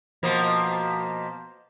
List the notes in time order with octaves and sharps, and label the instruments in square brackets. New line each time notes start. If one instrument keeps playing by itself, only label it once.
[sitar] B2 F3 A#3